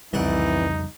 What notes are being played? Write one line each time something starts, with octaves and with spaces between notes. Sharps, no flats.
C2 F2 C#3 E3 G3 D#4 D5 F#5